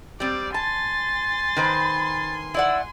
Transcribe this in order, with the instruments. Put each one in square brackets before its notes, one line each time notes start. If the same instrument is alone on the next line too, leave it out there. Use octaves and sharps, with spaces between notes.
[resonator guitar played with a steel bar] G3 C4 [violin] D5
[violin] G#5 C6 [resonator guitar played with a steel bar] A5 [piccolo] A6
[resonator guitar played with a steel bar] D#3 B4 C5
[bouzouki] E4 D5 F#5 [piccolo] E6